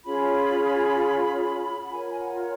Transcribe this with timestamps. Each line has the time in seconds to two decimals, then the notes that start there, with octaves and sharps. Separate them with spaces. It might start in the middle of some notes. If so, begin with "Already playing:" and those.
0.05 C#4 F4 G#4 C#5 B5
1.84 F#5
1.90 F4 A#4 C#5 G#5
2.10 G#5
2.21 F#5